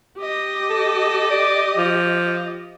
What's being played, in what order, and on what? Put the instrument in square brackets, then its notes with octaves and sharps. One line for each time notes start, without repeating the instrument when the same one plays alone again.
[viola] G4 D#5
[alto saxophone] A4
D5
F3